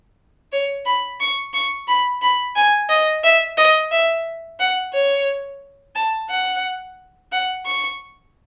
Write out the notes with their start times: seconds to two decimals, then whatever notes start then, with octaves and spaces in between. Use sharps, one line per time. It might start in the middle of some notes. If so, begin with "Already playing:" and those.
0.52 C#5
0.86 B5
1.20 C#6
1.54 C#6
1.88 B5
2.22 B5
2.56 G#5
2.89 D#5
3.24 E5
3.58 D#5
3.92 E5
4.60 F#5
4.93 C#5
5.95 A5
6.30 F#5
7.32 F#5
7.66 C#6